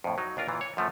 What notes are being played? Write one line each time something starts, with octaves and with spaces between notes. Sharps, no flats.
F2 A2
F#3 D#4
D#2 D4 F4 A#4
A#2 E3
C#5
F#2 F3 A3